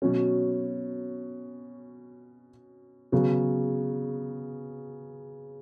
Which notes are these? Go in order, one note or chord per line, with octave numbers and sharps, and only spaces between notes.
B2 F#3 C#4
C#3 F#3 B3